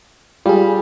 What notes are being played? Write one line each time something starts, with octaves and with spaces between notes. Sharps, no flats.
G3 F4 G#4